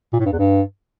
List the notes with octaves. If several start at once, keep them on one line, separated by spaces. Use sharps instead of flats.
A#2
A2
G2
E2
G2